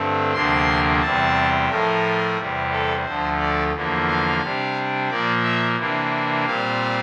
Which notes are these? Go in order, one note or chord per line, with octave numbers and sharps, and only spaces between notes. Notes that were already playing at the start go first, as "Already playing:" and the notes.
Already playing: G2 D3 A3 C4
D2 C3 F3 A#3 D4 C6
E2 C3 G3 C4 A5
A2 F3 A3 A#4
E2 C3 G3
A4
D2 D3 F3 A3 C5
D5
E2 D3 F3 A#3
F5
C3 G3 D4
A#2 F3 A#3 D5
E5
C3 E3 A#3 D4
A#2 G3 C4 F5